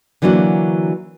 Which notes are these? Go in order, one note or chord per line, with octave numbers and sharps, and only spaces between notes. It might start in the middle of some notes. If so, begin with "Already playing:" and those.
D3 E3 F#3 A#3 D4 F#4